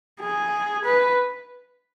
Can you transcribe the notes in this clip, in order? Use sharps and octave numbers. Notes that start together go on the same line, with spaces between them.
G#4
B4